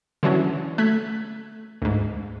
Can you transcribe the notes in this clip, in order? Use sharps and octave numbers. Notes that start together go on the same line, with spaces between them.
D3 E3 F#3 C#4
A3 F#6 G#6 B6
D2 G#2